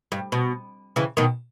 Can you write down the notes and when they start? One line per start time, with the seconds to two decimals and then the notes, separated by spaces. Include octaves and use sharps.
0.12 G2
0.32 B2
0.96 C#3 E3
1.17 B2 D#3